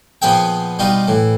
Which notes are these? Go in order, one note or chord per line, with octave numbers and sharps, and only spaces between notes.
A#2 F3 B3 G#4 G5
B2 G3 D#4 F4
A2 E3